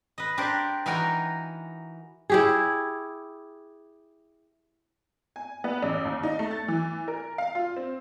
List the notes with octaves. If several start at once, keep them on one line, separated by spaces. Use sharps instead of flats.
B4 D#5
D4 G4 A#4 C5
E3 D#4 F#4 A#4 G5 G#5
E4 G4 G#4
G#5
B3
A1
D#2
D#4
A3
A6
E3
A#4
F5
F4
C4